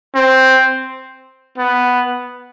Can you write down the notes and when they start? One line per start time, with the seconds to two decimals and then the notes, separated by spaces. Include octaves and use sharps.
0.15 C4
1.58 B3